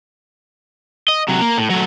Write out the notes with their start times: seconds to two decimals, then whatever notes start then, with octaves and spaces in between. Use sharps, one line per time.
1.08 D#5
1.28 C3 F#3
1.41 A#3
1.58 A2
1.70 F#3 A3